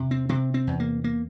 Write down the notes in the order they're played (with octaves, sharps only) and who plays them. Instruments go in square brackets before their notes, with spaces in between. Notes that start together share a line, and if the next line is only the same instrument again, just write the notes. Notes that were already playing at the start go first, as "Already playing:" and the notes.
Already playing: [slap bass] E2 C3
C4
C3 C4
C4
E2
A#3
A#3